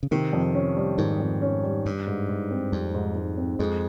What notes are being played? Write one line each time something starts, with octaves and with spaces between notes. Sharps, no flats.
C#3
C3 D#3
F2
C#4
G3
G#2 D#3
F2
C#4
G3
G2 G3
G#2
G#2
C4
F2 G3
G#2
G#2
C4
F2 G#3